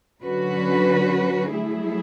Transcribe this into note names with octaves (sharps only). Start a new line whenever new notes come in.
D3 F#3 C#4 F#4 B4
F#3 A3 E4 G#4